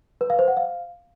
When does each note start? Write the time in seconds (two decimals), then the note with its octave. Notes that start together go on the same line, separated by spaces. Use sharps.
0.21 B4
0.30 F5
0.39 C5
0.48 F#5
0.57 F5